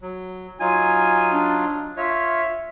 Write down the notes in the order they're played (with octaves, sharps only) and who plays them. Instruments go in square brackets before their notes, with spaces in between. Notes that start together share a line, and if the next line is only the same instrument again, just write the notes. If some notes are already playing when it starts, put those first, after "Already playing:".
[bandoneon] F#3
[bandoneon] F#3 D#4 F4 [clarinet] G#5
[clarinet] D4
[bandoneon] F4 C#5 [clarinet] E5